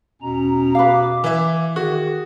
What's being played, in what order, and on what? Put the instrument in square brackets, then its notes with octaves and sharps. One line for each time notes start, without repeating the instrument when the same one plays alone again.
[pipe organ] E2 C#4 A#5 [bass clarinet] B2
[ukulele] B4 F5 [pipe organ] D6
[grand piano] E3 E5
[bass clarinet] D#3 [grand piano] F#4 [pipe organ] G#4